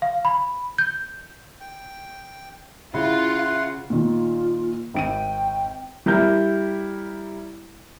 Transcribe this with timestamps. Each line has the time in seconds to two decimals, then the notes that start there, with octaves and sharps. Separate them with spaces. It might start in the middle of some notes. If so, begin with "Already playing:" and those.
0.02 F5
0.25 B5
0.78 G6
1.60 G5
2.94 C#3 E4 F4 F#5 C6
3.90 A#2 D#3 F4
4.94 G#1 G5 D7 D#7
6.06 G3 E4 A#4 G6